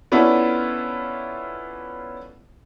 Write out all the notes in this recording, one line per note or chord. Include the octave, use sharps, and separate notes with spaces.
B3 C#4 D4 E4 F4 A4